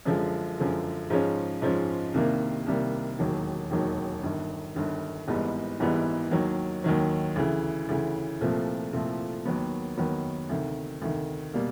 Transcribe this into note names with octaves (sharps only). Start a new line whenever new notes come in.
F#2 D3 F3 G#3
F#2 D3 F3 G#3
G#2 F3 G#3 C#4
G#2 F3 G#3 C#4
C2 C3 D#3 G3 A#3
C2 C3 D#3 G3 A#3
E1 D#2 D#3 F#3
E1 D#2 D#3 F#3
G1 G2 D#3
G1 G2 D#3
G#1 G#2 E3 G3 B3
G#1 G#2 E3 G3 B3
D#2 D#3 F#3
D#2 D#3 F#3
D2 C#3 E3
D2 C#3 E3
C2 A#2 F3 A3 C4
C2 A#2 F3 A3 C4
D#2 D#3 F#3 B3
D#2 D#3 F#3 B3
D2 C3 D#3
D2 C3 D#3
B2 G3 A#3